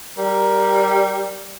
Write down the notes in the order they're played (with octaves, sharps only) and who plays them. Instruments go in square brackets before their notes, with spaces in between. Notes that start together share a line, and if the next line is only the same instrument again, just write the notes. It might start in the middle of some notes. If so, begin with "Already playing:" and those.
[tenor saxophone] G3 [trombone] A#4